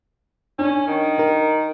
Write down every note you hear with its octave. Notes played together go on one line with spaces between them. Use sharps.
C#4 D4
D#3
A#4